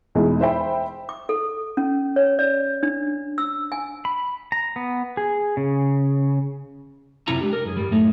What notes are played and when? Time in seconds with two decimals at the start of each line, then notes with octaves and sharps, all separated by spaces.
0.15 E2 B2 G#3 D#4 E4
0.41 C5 E5 G5 B5
1.09 D6
1.29 A4
1.77 C#4
2.16 C#5
2.39 D5
2.83 D4
3.38 E6
3.72 G#5
4.05 B5
4.52 A#5
4.76 B3
5.17 G#4
5.57 C#3
7.28 F#2 C3 E4 F4 A#5
7.41 G#3 D4 G4
7.53 A#4
7.65 F#2 G#4
7.77 G2 G3
7.91 F#2 A2 A3 D#4